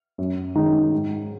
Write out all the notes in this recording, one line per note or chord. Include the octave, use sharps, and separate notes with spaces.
F#2
D#3 G#3 D#4
G#2